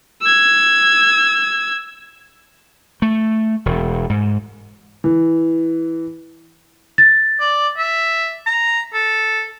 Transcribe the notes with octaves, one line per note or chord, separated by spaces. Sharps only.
E6 G#6
A3
E1
G#2
E3
A6
D5
E5
A#5
A4